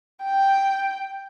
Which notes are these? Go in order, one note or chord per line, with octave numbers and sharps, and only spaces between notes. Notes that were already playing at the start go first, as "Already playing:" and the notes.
G5